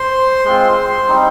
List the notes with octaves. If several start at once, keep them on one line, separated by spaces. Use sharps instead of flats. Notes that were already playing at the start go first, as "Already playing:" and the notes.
Already playing: C5 C6
G#3 C4 F4
G3 C4 D#4